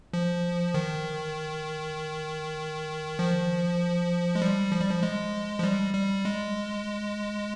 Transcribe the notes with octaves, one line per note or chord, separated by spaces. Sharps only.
F3
D#3
F3
G#3
G3
F3
G3
F3
G#3
F3
G3
G3
G#3